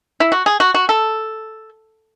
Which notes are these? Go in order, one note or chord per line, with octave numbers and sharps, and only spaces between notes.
E4
F#4
G#4
F#4
F#4
A4